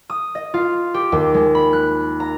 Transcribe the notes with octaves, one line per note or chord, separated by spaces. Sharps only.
D#6
D#5
F4
G4
D#2
G#3
B5
F#6
A#5